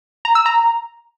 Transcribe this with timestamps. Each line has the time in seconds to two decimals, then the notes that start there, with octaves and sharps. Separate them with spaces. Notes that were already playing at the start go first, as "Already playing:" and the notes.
0.25 A#5
0.35 E6
0.46 A#5